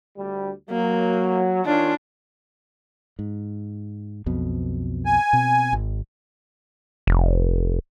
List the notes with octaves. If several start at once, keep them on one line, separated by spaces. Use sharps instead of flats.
D2 G3
F#3 A#3
D#3 C#4 D4 F4
G#2
B1 F2 B2
G#5
B2 C4
G#1
F1